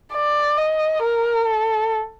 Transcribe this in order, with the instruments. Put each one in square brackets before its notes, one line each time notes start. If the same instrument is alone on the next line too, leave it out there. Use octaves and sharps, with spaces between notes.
[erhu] D5
D#5
A#4
A4